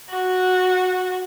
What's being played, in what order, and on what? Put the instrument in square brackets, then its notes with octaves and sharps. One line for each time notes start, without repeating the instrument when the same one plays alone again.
[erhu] F#4